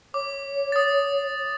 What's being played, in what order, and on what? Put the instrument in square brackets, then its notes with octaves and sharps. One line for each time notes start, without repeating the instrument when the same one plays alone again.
[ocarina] C#5 [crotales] D6
[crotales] D#6 A6